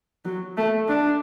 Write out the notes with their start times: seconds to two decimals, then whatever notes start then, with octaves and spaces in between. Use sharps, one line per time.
0.25 F#3
0.57 A3
0.88 D4